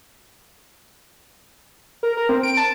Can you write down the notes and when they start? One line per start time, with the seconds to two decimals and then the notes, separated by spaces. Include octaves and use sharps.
2.03 A#4
2.17 A#4
2.29 C4
2.43 D7
2.57 A5